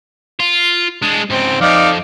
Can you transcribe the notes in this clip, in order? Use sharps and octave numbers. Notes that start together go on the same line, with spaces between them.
F4
G#3 D4
C#2 G#2 C4
F2 D#4 D5 F5